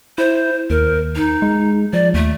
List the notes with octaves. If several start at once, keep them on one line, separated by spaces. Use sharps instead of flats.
E4 C5
D#2 A#4
D#4
G#3
F3 D5
D#2 A3